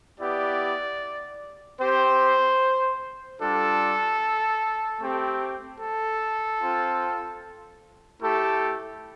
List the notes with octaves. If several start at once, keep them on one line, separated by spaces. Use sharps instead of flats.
B3 E4 G4 D5
C4 G4 C5
G3 D4 F4 A4
A3 C4 G4
A4
C4 F4
A3 E4 G4 A4